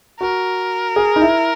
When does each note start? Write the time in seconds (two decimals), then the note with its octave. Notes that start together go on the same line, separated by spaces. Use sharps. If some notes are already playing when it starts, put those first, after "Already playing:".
0.20 F#4 A#4
0.96 G#4
1.16 D#4
1.21 E4